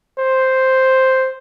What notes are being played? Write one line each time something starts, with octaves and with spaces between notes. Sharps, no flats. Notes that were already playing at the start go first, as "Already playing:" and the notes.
C5